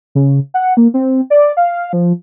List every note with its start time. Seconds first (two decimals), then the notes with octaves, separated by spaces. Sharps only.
0.15 C#3
0.54 F#5
0.77 A#3
0.94 C4
1.30 D5
1.57 F5
1.93 F3